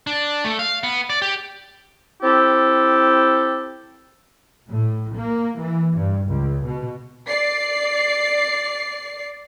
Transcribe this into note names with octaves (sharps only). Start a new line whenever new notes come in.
D4
A3
F5
B3
D5
G4
C4 E4 G4 A4
A2
A#3
E3
G2
C#2
B2
D5 C7